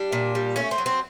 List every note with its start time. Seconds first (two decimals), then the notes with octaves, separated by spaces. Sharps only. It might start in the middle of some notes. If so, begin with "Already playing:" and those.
Already playing: G3 D4
0.12 A#2
0.35 G3
0.56 A3 C#4
0.71 C4
0.78 F#3
0.86 C4